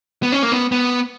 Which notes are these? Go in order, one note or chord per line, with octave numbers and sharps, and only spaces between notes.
B3
C#4
A#3
B3
B3